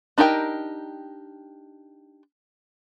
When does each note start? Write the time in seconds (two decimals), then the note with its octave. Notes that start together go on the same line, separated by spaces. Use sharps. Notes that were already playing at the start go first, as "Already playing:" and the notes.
0.18 D4 D#4 G4 A#4 G5